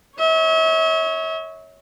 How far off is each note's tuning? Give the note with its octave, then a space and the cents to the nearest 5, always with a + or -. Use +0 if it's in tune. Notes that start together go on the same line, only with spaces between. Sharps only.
C#5 +0 E5 -40